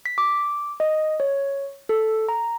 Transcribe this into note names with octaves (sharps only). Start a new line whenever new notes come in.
B6
D6
D#5
C#5
A4
A#5